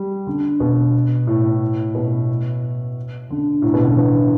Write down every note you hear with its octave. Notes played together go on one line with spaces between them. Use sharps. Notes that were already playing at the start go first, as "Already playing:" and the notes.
Already playing: G3
D3
B2
A2
B2
D3
A2
B2
D3
E3